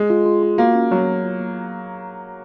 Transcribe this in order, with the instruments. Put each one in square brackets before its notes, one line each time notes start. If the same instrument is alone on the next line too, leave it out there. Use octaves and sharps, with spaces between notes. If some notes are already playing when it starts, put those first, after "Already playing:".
Already playing: [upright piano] G#3 [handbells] D#5
[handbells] F4
F4
F4
[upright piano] A#3 [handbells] F#4
[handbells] C#4
[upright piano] F#3 [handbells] F#4
[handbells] F#4
F4
A#3